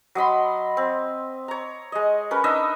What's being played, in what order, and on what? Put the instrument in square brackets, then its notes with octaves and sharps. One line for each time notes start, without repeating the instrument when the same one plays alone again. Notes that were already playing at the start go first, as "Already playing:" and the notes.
[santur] F#3 D#5 B5 C6
C4
C#5 A#5
G#3 D#5
C#4 A#4 B4
D4 D#4 D#5 E5